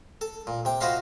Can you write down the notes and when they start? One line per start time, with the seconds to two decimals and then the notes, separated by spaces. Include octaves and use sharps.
0.21 A4
0.47 A#2
0.65 C3 G5
0.81 F4 F#4 C5 D#5 F5 B5